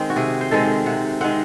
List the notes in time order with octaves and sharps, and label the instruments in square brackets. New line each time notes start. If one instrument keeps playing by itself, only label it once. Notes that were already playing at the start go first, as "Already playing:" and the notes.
Already playing: [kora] D#3 G#3 C4
F#4
C3 G#4
C5
D#3 G#3 C4 A4
C3 F#5
D#3 G#3 C4 F#5